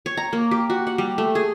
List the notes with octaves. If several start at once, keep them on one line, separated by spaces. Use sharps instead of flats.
C#5
A#5
A#3
G4
F#4
F#5
G3
A3
G#4